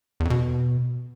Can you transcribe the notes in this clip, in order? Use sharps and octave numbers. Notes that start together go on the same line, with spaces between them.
E2
F2
B2